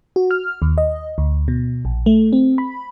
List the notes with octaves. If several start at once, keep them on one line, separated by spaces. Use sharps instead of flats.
F#4
F6
D#2
D#5
D2
B2
A#1
A3
C4
B5